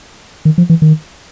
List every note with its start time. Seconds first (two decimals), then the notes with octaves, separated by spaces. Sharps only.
0.45 D#3
0.58 F3
0.70 E3
0.82 D#3